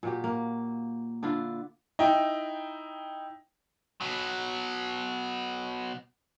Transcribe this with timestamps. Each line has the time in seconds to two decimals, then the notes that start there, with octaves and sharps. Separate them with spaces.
0.03 A#2 F#3 G4
0.24 A#3
1.23 D3 D4 E4 F4
1.99 D#4 E4 G5
4.01 B2 F#3